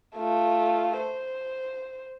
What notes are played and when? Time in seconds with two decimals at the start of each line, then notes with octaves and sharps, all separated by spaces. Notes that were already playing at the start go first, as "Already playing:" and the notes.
0.16 A3 F4
0.99 C5